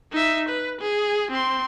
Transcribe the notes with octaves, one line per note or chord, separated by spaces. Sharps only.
D#4 E5
B4
G#4
C4 C6